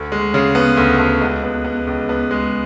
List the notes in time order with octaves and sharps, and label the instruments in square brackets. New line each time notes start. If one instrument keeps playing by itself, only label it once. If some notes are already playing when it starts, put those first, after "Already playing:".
Already playing: [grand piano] D2
G#3
C#3
B3
D2
D2
C#2
B3
B3
C#2
B3
G#3